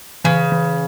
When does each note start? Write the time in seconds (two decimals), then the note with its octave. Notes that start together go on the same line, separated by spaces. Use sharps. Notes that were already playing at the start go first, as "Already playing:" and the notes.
0.24 C#3 E3
0.52 E3